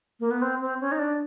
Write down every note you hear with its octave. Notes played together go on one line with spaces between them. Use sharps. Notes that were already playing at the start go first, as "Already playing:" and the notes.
A#3
B3
C4
C4
C#4
D#4
D4